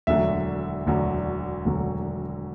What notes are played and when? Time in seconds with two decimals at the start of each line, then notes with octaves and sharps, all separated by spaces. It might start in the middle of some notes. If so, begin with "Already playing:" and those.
0.07 E1 D2 D3 F#3 E5
0.86 E1 D2 D3 F#3
1.65 E1 D2 D3 F#3